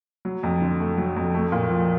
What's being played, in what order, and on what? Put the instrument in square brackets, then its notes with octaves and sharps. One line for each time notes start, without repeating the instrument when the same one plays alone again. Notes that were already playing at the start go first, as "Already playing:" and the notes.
[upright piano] F#3
F2
D3
A3
F#3
F2
A3
A#2
F3